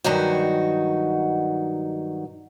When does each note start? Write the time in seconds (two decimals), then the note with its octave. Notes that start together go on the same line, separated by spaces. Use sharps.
0.04 G2 D#3 F#3 D#4 F#4